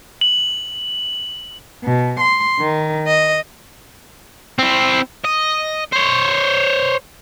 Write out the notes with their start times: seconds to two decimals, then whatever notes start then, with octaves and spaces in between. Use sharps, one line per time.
0.21 F#7
1.84 B2
2.21 C6
2.60 D#3
3.06 D#5
4.59 C4 E4
5.25 D#5
5.93 C5 C#5